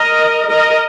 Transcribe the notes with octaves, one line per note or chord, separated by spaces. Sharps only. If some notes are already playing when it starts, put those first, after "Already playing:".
Already playing: A#4 D#5
A#4 D#5